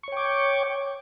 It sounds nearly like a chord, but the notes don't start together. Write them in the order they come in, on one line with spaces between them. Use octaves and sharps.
C#6 C#5 G5 D6